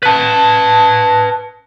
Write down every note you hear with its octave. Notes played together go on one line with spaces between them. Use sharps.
B4 A5